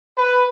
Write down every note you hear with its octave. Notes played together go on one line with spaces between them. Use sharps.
B4